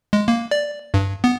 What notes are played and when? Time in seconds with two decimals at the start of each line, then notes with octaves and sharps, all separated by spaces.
0.13 G#3
0.28 A#3
0.51 D5
0.94 G2
1.24 B3